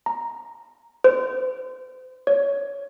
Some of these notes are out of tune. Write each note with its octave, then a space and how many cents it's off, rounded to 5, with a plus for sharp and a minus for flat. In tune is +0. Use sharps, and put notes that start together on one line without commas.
A#5 +0
C5 -35
C#5 +15